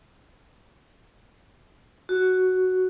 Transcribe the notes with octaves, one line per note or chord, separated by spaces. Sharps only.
F#4